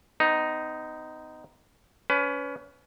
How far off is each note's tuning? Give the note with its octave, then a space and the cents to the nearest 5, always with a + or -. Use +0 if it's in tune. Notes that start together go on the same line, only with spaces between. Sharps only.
B3 +40 D#4 +0
C#4 +30 B4 +25